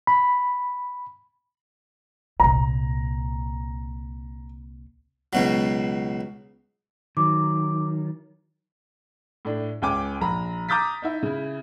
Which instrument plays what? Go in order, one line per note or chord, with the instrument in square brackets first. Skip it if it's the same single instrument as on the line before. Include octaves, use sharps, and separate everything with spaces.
[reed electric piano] B5
[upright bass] C2 A#2 [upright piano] A#5
[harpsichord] C#2 B2 F#3
[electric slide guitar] D#3 F#3 [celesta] D6
[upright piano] A2 D4
C#2 C#4 G5 G#5 D6
A#1 A#5 B5
A#5 D6 D#6 G6 A6 B6
D#4 E4 E5
C#3 E4